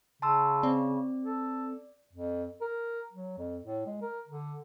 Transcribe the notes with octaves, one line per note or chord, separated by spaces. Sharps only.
C#3 A5 C6 E6
C4 D5
A4
F2
A#4
F#3
F2
A2
G#3
A#4
D3